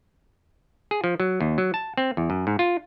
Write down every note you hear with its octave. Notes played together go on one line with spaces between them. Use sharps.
G#4
F3
F#3
D#2
F#3
A5
C4
E2
F#2
G#2
F4